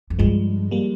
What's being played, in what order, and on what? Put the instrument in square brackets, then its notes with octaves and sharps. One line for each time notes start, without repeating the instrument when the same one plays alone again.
[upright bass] F2
[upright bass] G2 [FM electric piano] F3 G#3
[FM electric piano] G3 A#3